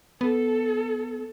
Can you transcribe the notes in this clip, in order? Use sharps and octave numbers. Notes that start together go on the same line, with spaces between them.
B3 A4